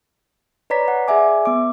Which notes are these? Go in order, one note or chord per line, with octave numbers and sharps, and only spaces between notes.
B4 C#5 D5 A#5 B6
F#5
G#4 D5 E5 G#5 D6
E5
B3 D6